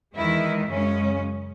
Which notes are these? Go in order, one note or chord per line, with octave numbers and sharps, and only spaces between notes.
E2 D#3 G#3 E4
F#2 C#3 G#3 C#4